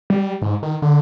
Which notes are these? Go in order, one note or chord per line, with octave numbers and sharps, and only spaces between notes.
G3
G#2
D#3
D3